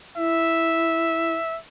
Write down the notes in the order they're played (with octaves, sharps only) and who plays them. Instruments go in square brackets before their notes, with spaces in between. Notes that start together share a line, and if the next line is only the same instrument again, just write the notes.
[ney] E4 [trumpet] E5